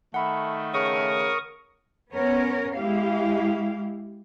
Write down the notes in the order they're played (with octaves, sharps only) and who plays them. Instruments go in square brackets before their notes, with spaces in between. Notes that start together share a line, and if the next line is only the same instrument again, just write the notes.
[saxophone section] D#3 A3 [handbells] F#5 B5
[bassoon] C#3 [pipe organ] A#4 C#6 D#6
[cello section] B3 C#4 A#4 C#5
G#3 E4 G4 F5